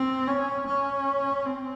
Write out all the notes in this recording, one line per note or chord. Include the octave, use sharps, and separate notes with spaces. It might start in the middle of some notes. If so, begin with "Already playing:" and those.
Already playing: C4
C#4
C#4
C4